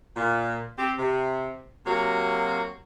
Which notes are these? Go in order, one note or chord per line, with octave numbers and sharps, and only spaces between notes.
A#2
C4 G4
C3
C3 F#3 A#3 F#4